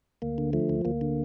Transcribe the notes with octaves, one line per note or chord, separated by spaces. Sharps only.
D2 A#3
D3
F3 A3
D2
D2 A#3
D3